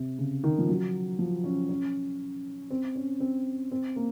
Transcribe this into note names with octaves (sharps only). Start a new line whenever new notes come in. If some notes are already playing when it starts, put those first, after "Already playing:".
Already playing: C3
C#3
D#3
F3
F#3
F3
C#4
C#4
C4
C#4
C4
C4
A#3